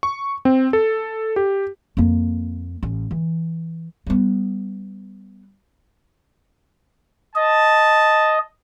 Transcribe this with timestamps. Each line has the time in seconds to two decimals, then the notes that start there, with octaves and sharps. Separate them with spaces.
0.03 C#6
0.45 C4
0.73 A4
1.36 G4
1.97 F2 A#3
2.83 A1
3.11 E3
4.07 G3 B3
7.35 D#5 A5